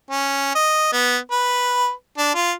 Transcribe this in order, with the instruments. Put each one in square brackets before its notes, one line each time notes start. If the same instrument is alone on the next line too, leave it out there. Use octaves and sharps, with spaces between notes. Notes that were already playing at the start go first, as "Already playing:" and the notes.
[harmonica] C#4
D#5
B3
B4
D4
F4